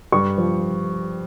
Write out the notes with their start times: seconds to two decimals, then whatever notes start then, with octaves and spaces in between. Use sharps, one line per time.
0.12 G2 C#6
0.38 F3